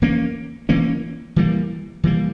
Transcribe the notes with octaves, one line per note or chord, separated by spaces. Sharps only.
E3 A#3 C#4
E3 A#3 C#4
E3 G3 A#3
E3 G3 A#3